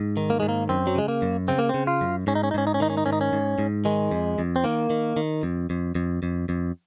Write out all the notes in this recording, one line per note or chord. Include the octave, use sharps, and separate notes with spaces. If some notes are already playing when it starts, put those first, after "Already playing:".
Already playing: G#2
D#3
A#3
G#2 G#3
A#3
F#2 C4
F#3
C#3 G#3
A#3
F#2
C#3 C4
A#3
C#3 C4
F4
F#2
G#2 C#4
D#4
C#4
D#4
G#2 C#4
D#4
C#4
D#3 D#4
C#4
D#4
G#2 C#4
D#4
C#4
G#2
G#2
D#3 G#3
F2
F2
C4
D#3 A#3
D#3
D#3
F2
F2
F2
F2
F2